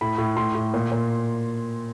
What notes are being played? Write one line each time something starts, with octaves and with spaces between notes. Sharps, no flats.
A2 B5
A2
A2 C6
A2
A#2
A#2